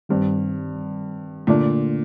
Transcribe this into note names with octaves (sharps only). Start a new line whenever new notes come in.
G2 D#3 G3 C4
A#2 D3 A3 D4